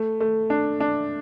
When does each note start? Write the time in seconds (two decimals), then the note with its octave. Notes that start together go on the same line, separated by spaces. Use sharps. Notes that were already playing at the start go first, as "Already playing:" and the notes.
Already playing: A3
0.20 A3
0.50 D4
0.80 D4